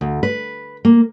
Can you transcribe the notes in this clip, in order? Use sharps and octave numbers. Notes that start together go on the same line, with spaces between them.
D2
B4
A#3